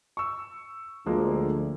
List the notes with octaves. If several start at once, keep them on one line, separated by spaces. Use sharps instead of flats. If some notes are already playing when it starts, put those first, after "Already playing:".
C#6 E6
D2 F3 G#3 A#3